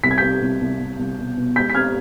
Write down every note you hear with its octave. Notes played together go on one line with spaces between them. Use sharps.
C2 B6
G#6
C2 G6 B6
C2
C2
C2
C2
B2
B2
G#3 G6 B6
B6
C4 F6 G#6